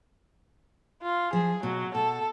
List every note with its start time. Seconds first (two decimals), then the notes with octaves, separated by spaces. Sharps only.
1.02 F4
1.33 F3 G#4
1.63 B2 F#3
1.95 B2 A4